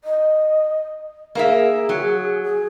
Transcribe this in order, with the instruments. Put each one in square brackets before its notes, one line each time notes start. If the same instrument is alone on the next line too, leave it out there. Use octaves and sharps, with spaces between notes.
[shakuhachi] D#5
[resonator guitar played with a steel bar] A#3 A#4 E5 [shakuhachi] G#4
[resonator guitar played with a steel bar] F#3
[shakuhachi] G#4